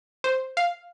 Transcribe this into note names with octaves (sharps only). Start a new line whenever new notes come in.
C5
F5